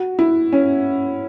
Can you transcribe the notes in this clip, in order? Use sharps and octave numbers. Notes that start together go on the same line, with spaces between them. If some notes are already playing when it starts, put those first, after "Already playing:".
Already playing: F#4
E4
C#4